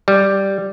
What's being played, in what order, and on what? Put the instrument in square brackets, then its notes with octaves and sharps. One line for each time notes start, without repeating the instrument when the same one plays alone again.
[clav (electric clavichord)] G3